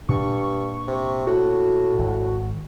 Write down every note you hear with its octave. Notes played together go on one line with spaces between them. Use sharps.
G2 A#2 D4 C#6
C3
A2 F#4
G#1